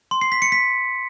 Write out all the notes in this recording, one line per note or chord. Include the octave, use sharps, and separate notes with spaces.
C6
C7
B6
C#7
B6